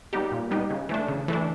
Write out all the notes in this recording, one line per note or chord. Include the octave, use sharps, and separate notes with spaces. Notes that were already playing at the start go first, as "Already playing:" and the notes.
G3 B3 D#4 G4
A#2
G3 B3 D#4 G4
C#3
E3 A3 D4
C#3
E3 A3 D4